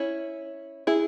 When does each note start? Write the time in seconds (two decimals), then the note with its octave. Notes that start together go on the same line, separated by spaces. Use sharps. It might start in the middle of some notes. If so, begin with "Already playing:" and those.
Already playing: C#4 E4
0.87 E4 G#4